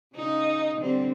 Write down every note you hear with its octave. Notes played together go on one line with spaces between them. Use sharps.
C#3 D#4
D3 G3 C4